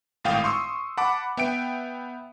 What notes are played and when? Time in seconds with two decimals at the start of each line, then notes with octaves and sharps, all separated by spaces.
0.24 G#1 A2 F5 G5 D#6
0.44 C6 C#6 D#6 E6
0.97 F#5 A5 B5 D6
1.37 B3 E5 G5 D7